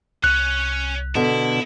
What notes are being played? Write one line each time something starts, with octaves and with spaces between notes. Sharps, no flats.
C2 C#4 C#5 F#6
B2 D3 E4